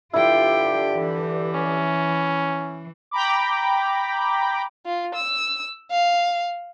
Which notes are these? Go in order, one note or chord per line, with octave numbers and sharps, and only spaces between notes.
G2 D3 E4 F4 G4 G5
E3
C#4
G5 A#5 B5 D6
F4
E6
F5